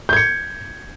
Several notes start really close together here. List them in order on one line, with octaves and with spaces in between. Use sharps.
G6 G#6 C#7